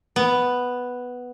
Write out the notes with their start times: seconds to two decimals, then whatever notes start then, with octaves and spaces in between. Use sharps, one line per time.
0.16 B3